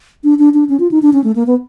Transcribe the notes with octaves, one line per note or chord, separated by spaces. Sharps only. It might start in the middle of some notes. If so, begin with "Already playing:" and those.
D4
D4
D4
C#4
F4
D#4
D4
C#4
A3
A#3
B3